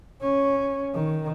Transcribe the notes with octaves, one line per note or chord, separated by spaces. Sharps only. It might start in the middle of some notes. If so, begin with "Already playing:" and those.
C#4
D#3